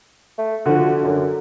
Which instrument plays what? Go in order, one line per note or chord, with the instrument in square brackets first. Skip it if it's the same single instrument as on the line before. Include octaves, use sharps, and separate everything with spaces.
[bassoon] A3
[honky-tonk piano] D3 F3 [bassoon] F#4
[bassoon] F#2 [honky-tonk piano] D3